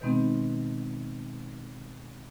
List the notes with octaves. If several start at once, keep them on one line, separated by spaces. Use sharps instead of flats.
B2 D#3 G#3 B3 C4 D#4